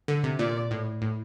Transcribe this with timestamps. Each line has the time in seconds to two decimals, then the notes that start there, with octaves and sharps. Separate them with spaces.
0.08 D3
0.24 C3
0.39 A#2 D5
0.71 A2
1.02 A2